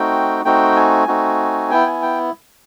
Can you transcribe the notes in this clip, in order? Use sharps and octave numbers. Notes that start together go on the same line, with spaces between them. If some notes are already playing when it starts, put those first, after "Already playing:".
Already playing: A3 C4 D#4 F#4 G5
A3 C4 D#4 F#4 G5
G#5
A3 C4 D#4 F#4
B3 E4 G5
G#5
G5